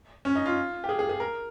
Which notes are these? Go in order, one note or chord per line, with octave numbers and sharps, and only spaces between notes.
C#4
D#4
F4
G4
G#4
G#4
G#4
A#4